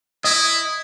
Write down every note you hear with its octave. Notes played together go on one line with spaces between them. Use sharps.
E4 D#5